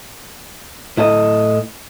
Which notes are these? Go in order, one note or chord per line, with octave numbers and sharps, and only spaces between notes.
A2 E4 A4 D#5